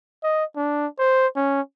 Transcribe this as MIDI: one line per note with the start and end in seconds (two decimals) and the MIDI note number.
0.24 0.45 75
0.57 0.87 62
0.99 1.27 72
1.36 1.61 61